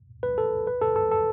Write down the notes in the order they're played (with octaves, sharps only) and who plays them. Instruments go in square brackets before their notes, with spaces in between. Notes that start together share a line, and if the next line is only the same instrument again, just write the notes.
[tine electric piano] B4
A4
B4
A4
A4
A4